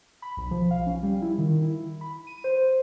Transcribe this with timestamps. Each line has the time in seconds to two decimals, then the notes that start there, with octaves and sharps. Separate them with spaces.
0.22 B5
0.37 B1
0.51 F3
0.71 F5
0.87 C#4
1.03 G3
1.22 E4
1.38 D#3
1.62 E4
2.01 B5
2.27 D#7
2.44 C5